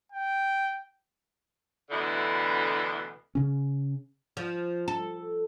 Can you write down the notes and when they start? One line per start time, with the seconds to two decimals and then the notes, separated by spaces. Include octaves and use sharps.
0.12 G5
1.90 D2 B2 D3 E3 E4
3.35 C#3 C#4
4.37 F3
4.88 A4